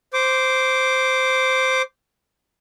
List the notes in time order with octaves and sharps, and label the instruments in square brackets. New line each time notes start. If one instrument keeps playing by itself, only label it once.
[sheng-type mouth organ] C5 D6